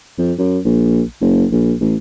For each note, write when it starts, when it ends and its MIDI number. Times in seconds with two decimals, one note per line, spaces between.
0.18 0.33 41
0.38 0.59 42
0.65 1.02 34
1.21 1.46 30
1.52 1.74 34
1.80 1.96 33